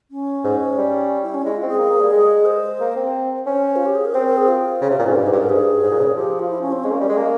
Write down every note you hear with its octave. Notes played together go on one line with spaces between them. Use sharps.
C#4
G#2
G3
E4
C#4
G#3 E4
F4
C4
G#4
A#3
A#3
G3
G#3
C5
A#3
C4
C#4 C5
F4
G4
G#4
A#4
C4 C5
A#4
G#4
F4
C#3
C3
A#2
G#2 C#4
G2 E4
G#2
G4
G2
G#2 A#4
G2 G#4
G#2
A#2
C#3
F3 G4
F4
E4
C#4
C4
G#3 C#4
A#3
G3
G#3
A#3